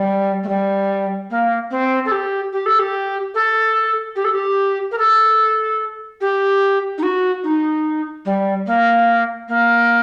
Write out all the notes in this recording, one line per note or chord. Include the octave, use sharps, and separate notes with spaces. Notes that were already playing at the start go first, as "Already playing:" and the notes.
Already playing: G3
A3
G3
A#3
C4
A4
G4
G4
A4
G4
A4
G4
A4
G4
A#4
A4
G4
D#4
F#4
D#4
G3
A#3
A#3